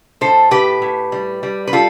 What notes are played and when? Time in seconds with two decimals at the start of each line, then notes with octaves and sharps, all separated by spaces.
0.21 A2 A4 C5
0.51 A2 G4 B4
0.82 A2
1.12 G3
1.43 G3
1.67 B4
1.73 G3 F4 A4